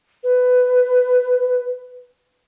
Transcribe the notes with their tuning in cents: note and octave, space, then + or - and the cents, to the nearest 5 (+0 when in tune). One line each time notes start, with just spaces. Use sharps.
B4 +15